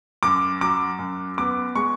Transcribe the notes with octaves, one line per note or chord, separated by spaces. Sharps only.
F#2 D6
F#3 D6
F#2
B3 D6
G#3 C#6